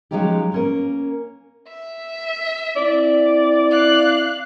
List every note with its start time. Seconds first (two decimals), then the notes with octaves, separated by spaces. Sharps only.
0.11 F3 F#3 G#3 C#4 D#4 G4
0.52 A#3 C#4 A#4
1.68 E5
2.76 C4 E4 D5
3.71 F5 F#6